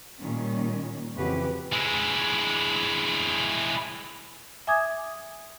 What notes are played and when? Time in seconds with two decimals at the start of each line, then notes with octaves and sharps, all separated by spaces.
0.19 A#2 D#3 G3 C#4
1.15 F2 C#3 E3 F#4 G4 B4
1.73 G#3 E4
4.67 E5 G#5 D6 D#6 G#6